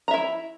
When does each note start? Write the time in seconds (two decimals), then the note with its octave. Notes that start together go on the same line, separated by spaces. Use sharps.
0.08 A#5
0.11 E5
0.14 E4